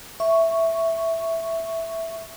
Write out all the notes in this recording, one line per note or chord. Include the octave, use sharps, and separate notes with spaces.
E5 C#6